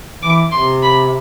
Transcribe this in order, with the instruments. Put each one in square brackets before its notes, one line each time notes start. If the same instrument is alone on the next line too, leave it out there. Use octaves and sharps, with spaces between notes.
[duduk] E3 [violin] D6
[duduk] C3 [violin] C6
[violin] B5